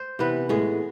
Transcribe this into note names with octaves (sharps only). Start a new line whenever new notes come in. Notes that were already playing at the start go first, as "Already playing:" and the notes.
Already playing: C5
C3 E3 B3 B4
A2 G#3 B3 G#4